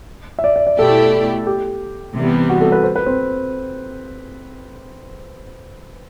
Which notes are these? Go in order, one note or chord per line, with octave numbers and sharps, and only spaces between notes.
E5
D5
D5
D5
B2 A3 E4 G4 A4 D5
G4
C3 E3 G3 B3
F#4
A4
B4
C5
B4
C4